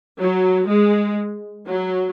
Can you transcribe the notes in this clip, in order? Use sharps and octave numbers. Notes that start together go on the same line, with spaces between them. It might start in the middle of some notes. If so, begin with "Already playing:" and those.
F#3
G#3
F#3